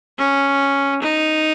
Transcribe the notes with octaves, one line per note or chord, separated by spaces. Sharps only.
C#4
D#4